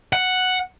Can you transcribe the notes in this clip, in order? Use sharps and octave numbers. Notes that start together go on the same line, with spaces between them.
F#5